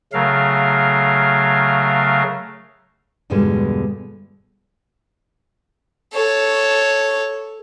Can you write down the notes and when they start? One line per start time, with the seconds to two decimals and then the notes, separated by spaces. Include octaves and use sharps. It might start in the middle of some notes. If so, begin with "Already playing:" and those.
0.13 C#3 F#3 A3 A#4 F5
3.30 E2 G2 B2 D3 G3 G#3
6.13 A4 C#5